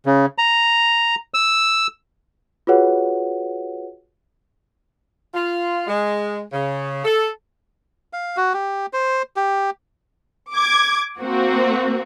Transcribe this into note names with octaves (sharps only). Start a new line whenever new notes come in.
C#3
A#5
E6
F4 F#4 G#4 B4 C#5 F#5
F4
G#3
C#3
A4
F5
F#4
G4
C5
G4
D6 G#6
A#3 C4 F#4